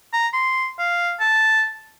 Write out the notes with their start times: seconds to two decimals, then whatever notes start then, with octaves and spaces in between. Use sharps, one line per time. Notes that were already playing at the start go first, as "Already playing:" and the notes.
0.13 A#5
0.34 C6
0.79 F5
1.20 A5